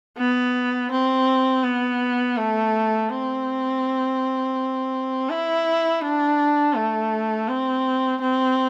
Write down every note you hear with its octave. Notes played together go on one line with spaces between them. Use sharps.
B3
C4
B3
A3
C4
E4
D4
A3
C4
C4